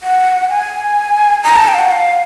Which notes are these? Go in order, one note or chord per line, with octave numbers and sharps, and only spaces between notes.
F#5
G#5
A#5
A5
G5
F5
F#5
F5